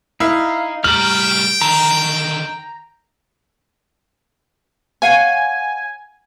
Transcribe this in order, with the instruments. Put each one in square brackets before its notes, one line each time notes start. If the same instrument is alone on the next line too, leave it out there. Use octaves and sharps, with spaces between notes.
[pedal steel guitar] D#4 F5 [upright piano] E4
[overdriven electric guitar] A2 G3 [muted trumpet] G5 [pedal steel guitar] A#5 F6 [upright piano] F#7
[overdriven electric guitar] D3 D#3 [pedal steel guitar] A#5
[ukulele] C#5 F5 F#5 [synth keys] G#5